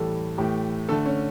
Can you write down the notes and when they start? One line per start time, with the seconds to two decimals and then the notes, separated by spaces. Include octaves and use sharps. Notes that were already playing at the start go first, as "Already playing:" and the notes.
Already playing: A2 E3 G3 A4
0.38 A2 E3 A3 G4
0.89 D3 A3 A4
1.05 C#4